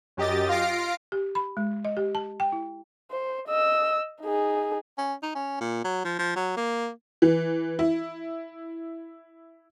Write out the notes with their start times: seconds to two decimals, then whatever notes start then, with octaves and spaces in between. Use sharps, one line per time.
0.17 F#2 G4 D#5 A6
0.48 F4 F5 A#6 C7 D7
1.12 G4
1.35 B5
1.57 G#3
1.85 D#5
1.97 G4
2.15 A5
2.40 G5
2.52 E4
3.11 C5
3.47 D#5 E6
4.21 D#4 G#4
4.98 C#4
5.23 D#4
5.35 C#4
5.61 A#2
5.84 F#3
6.05 F3
6.19 F3
6.36 F#3
6.57 A#3
7.22 E3
7.79 E4